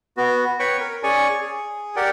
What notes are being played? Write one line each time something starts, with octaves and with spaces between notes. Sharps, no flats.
B3 F#4
B4 C#5 G5 B5 C#6
A#4
C#4 G#4 C#5 D5 G#5 C#6
G#4
G4 A#4 D5 F#5 G5